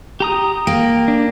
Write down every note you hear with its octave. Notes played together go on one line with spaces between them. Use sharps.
G4 A#5 D#6
A#3 G5
D4